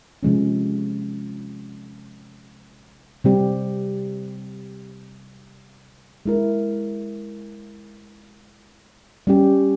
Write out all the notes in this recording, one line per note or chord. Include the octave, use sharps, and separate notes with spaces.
C3 F3 G#3 C#4
C3 G3 C4 G4
G#3 E4 A#4
G3 C#4 G4